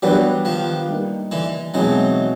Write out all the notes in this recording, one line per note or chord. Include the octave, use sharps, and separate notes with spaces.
E3 F#3 G3 B3 D4 G4
D#3 F3
G3 A#3 D#4
D3 E3
B2 E3 F#3 G#3 C4 D#4